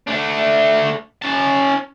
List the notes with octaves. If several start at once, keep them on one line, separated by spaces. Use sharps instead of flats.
A3 D4
C#4 A5